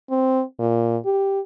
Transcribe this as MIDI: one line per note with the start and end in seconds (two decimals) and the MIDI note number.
0.10 0.43 60
0.59 0.97 46
1.05 1.40 67